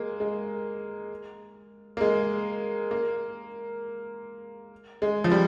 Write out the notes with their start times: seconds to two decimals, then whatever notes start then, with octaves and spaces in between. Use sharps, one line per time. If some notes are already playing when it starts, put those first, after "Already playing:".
Already playing: G#3 A#3
0.20 G#3
1.97 A#3
2.01 G#3
2.91 A#3
5.02 G#3
5.24 F3
5.32 G3